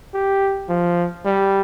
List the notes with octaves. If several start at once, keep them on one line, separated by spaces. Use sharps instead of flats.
G4
F3
G3